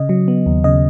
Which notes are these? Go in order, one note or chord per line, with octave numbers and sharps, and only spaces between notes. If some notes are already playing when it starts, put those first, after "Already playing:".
Already playing: C#3 D#5
F#3
B3
D#2
C#3 D#5